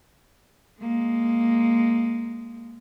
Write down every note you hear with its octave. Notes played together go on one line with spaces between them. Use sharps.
G#3 A#3